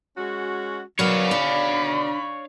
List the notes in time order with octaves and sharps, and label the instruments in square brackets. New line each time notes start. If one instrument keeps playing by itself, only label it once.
[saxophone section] G#3 C#4 F#4
[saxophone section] B2 D#3 D5 [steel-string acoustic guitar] F#3 A#4 B4 [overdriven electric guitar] C#5 F5
[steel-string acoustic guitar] D4 [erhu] B5